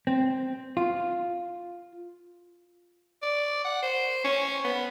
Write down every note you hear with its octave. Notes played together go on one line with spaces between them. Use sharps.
C4
F4
D5
F#5
C5
C#4
B3